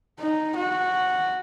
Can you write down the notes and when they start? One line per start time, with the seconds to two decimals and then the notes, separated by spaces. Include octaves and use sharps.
0.20 D#4
0.57 F#4